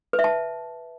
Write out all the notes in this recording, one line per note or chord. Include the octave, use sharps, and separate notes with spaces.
B4
E5
A5